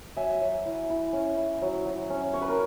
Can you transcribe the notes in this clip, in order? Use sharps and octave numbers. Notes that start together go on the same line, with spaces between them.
F#3 E5 G#5
F#3
E4
E4
C#4
E4
F#3
F#3
C#4
C#4 C#5
B4
A#4